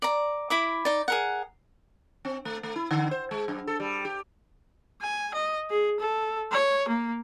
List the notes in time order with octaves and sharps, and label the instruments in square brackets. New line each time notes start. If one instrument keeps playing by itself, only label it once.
[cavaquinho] D5 A#5
E4 B5 D6
D#4 D5
G#4 A#4 F#5
[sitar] C4
A3
A3
E4
D3
C5
G#3
F#2
A4
G3
G4
[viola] G#5
D#5
G#4
A4
C#5
A#3